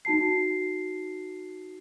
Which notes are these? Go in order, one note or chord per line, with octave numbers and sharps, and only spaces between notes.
D#4 F#4 A5 C7